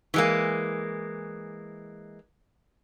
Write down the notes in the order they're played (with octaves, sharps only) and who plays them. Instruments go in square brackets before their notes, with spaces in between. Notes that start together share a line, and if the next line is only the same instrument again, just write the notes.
[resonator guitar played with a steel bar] E3 G#3 A#3